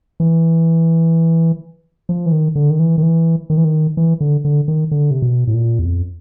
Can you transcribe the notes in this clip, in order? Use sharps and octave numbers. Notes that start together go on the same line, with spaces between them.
E3
F3
E3
D#3
D3
D#3
E3
D#3
E3
D#3
E3
D#3
E3
D3
D3
D#3
D3
C3
B2
A2
A#2
E2
F2